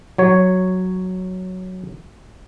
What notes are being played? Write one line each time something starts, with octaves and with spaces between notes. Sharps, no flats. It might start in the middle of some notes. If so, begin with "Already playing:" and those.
F#3 C#5